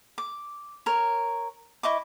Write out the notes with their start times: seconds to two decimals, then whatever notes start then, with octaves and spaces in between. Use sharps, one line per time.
0.18 D6
0.86 A#4 C#5
1.83 E4 D#5 C#6 D6